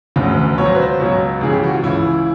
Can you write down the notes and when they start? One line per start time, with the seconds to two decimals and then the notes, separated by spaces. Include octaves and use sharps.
0.16 E1 D2 C#3
0.58 C#2 B2 F#3 C#5
0.65 C5
0.75 B4
0.82 C5
1.00 C#2 B2 F#3 C#5
1.41 C#2 C#3 E3 G#4
1.53 G4
1.63 F#4
1.74 F4
1.83 C#2 C#3 E3 E4